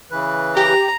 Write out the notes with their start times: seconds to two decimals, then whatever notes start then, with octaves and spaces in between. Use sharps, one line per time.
0.11 C#3 E3 B4
0.57 G4 A#5